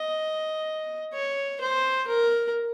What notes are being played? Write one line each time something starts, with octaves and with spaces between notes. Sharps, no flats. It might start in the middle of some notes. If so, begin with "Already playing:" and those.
Already playing: D#5
C#5
C5
A#4